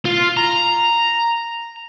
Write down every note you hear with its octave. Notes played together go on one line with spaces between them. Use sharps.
F4
A#5